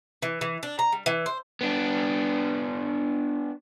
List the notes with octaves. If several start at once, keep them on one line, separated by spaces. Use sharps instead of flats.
E3
E3
D4
A#5
G3
E3
C5
B3 D4